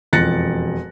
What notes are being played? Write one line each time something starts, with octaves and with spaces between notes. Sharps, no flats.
E1 F2 F#6 A6 A#6 C#7